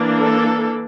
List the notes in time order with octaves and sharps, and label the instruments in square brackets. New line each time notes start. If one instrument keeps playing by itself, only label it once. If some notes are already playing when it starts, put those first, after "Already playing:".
Already playing: [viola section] E3 A#3 D4
A4